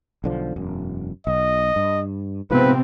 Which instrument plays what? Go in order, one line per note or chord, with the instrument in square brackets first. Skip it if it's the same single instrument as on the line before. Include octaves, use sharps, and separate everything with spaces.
[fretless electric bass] B1 D3 F3
E1 F#2
[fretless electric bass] B1 [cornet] D#5
[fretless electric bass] G2
[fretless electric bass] G#2 F3 [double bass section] C3 B3 C4 [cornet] B4